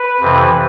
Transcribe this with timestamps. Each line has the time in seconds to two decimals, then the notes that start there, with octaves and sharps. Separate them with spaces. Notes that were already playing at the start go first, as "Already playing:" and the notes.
Already playing: B4
0.20 F2 C3 E3